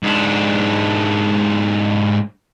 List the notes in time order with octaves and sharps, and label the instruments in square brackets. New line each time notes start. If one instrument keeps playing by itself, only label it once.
[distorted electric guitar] G#2 D4